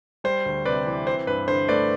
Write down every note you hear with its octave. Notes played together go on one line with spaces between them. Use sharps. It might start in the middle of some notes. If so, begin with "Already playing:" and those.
G3 C5
D2
C3 B4 D5
E3
C4 C5
G2 B4
D3 C5
A3 B4 D5